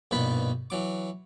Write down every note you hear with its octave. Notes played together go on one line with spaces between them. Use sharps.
A#1 G2 B2 D#4 B4 B5
E3 F#3 D6